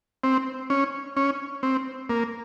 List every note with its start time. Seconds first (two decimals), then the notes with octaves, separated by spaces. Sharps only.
0.24 C4
0.70 C#4
1.17 C#4
1.63 C4
2.10 A#3